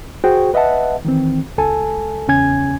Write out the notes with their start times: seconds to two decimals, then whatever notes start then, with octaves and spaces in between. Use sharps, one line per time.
0.24 F#4 G#4 C5 G5
0.54 B4 D#5 E5 F#5 A5
1.05 D#3 E3 C4
1.58 C#2 A4 G#5 A5
2.28 E2 C#3 C#4 G#5 G#6